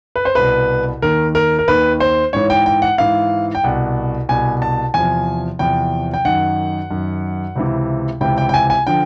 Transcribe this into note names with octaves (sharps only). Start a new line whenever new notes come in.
B4
C5
C2 B2 B4
D#2 D#3 A#4
A#4
A#4
D#2 D#3 B4
C5
G#2 E3 C#5
G5
G5
F#5
G#2 E3 F5
G5
C2 B2 F#5
C2 B2 G#5
A5
E2 C3 F3 G#5
E2 C3 F3 G5
G5
F#2 D#3 F#5
F#2 D#3
C#2 C3 E3
C#2 C3 E3 G5
G5
G5
G#5
G#5
D3 F3 G5